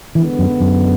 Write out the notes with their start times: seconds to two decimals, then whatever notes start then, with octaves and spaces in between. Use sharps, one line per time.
0.15 D3 E3 G#3 B3
0.39 F#2
0.61 F#2